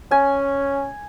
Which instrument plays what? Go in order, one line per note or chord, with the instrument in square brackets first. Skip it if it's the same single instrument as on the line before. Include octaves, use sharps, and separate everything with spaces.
[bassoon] C#4 [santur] G#5